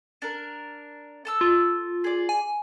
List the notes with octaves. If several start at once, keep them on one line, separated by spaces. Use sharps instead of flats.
D4 A#4
A4 A5 E6
F4
G#4 D5
G#5